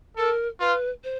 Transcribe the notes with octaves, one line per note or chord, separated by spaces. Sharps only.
A4 A#4
F4 B4
C5